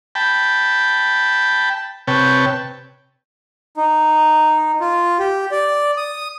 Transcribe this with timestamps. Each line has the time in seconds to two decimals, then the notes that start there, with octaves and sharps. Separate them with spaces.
0.15 G5 A5 B5
2.07 C3 B4 C#5 G5 A5
3.77 D#4
4.80 F4
5.19 G4
5.51 D5
5.97 D#6